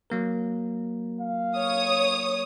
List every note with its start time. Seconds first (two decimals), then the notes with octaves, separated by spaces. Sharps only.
0.10 F#3 A#3 A#4
1.21 F5
1.57 C#5 D#6